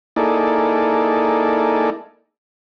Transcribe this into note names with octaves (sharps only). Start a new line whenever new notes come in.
A#3 D#4 E4 G#4 A4 D5